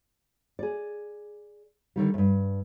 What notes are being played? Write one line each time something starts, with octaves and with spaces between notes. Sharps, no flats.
G#4 D5
D3 D#3 G3
E2 G2